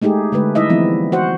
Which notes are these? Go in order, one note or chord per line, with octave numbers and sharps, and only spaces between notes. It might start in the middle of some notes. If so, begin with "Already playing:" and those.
G#3 A3 D#4 G4 G#4
D3 G#3 A3 B4
G3 D#4 E4 D#5 E5
E3 F3 G3 B3 C4 E4
F#4 C5 F#5